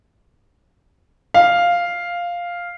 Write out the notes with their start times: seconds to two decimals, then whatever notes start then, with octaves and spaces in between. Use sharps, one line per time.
1.34 F5